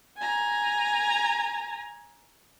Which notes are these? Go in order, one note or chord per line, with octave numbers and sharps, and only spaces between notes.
G#5 A#5